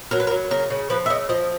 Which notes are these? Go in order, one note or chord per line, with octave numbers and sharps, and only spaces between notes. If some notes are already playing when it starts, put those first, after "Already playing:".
F#3 A#4
B4
A#4
F#3
C#3 A#4
C#3
F3 B4
E5
C#3 D#5
F3 D#5